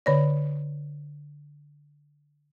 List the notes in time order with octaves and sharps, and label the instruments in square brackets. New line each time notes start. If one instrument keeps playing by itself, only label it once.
[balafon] D3 C#5 D5